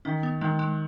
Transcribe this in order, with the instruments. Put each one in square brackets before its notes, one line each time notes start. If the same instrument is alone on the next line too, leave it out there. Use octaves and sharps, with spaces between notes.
[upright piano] D#3 [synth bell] C#4
[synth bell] B3
[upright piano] D#3 [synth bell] G#3
[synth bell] G#3